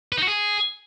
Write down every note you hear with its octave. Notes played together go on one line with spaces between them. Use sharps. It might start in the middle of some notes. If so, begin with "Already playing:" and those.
B4
D#4
F#4
G#4